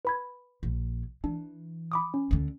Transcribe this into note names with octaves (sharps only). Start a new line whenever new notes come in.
B4 B5 G#6
A#1
E3 D4
B5 D6 D#6
C#4
D2 D3